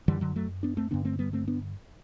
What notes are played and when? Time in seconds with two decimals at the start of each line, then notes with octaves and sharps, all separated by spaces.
0.08 F#2 D3 E3 G3
0.21 D3 F#3
0.36 F#3 A3
0.63 B3 D4
0.77 A3 C4
0.91 G2 D3 B3 D4
1.05 A3 C4
1.19 G3 B3
1.33 A3 C4
1.48 B3 D4